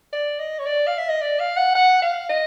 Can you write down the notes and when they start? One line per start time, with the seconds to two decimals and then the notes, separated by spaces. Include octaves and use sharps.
0.13 D5
0.39 D#5
0.59 C#5
0.66 D5
0.87 F5
0.98 E5
1.09 D#5
1.21 D5
1.39 F5
1.57 F#5
1.75 F#5
2.02 F5
2.29 D#5